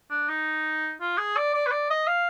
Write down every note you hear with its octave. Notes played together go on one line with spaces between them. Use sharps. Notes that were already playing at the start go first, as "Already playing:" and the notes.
D4
D#4
F4
G#4
D5
D5
B4
D5
D#5
F5